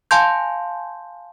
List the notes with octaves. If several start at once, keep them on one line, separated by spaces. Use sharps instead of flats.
F5 G#5 A5 C6 G6